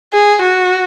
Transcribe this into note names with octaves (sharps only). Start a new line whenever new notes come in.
G#4
F#4